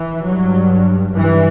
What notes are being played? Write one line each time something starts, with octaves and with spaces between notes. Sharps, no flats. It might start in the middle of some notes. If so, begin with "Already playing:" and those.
Already playing: E3
G2 F#3
G2 E3